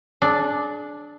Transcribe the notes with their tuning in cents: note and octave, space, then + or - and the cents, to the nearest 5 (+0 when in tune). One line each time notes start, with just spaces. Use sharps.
D4 +0 G#4 +35